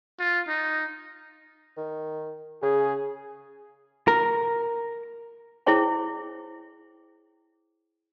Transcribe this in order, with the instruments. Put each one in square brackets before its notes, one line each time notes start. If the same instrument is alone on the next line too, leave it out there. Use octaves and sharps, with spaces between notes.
[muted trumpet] F4
D#4
[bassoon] D#3
[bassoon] C#3 [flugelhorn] G#4
[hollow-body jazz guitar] A#4
[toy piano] E4 G#4 C5 C#5 G5